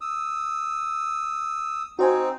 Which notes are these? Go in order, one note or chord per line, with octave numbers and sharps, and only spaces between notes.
D#6 E6
C4 D#4 F#4 C5 G#5